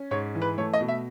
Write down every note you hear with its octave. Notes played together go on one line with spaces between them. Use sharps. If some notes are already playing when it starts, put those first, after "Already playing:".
Already playing: C#4
G#2 C#5
E3
B4
A3 C#5
D#5
B2
E5